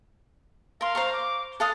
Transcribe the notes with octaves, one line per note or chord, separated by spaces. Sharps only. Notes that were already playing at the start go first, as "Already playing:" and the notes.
A#4 F5 C6
C5 A#5 C#6
D6
A4 F5 D#6 F#6